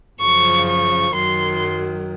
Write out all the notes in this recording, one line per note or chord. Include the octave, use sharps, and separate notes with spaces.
F#2 C#3 F3 C#6
C#6
F#2 D#3 F#3 C6